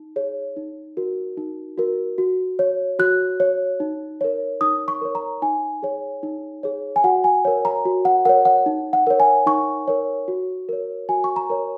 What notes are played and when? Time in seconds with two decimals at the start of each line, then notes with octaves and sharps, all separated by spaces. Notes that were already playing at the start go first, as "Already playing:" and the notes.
Already playing: D#4
0.16 G#4 C#5
0.56 D#4
0.97 F#4 A#4
1.37 D#4
1.78 F#4 A#4
2.18 F#4
2.59 C#5
2.99 F#4 F#6
3.40 C#5
3.80 D#4
4.21 A#4 C#5
4.61 D#4 D#6
4.88 C#6
5.01 A#4 C#5
5.15 A#5
5.42 D#4 G#5
5.83 G#4 C#5
6.23 D#4
6.63 G#4 C#5
6.96 G#5
7.04 F#4 F#5
7.24 G#5
7.45 A#4 C#5
7.65 A#5
7.85 F#4
8.05 F#5
8.25 A#4 C#5 F#5
8.45 F#5
8.66 D#4
8.93 F#5
9.07 A#4 C#5
9.20 G#5
9.46 D#4 C#6
9.88 A#4 C#5
10.28 F#4
10.69 A#4 C#5
11.09 F#4 G#5
11.24 C#6
11.36 A#5
11.50 A#4 C#5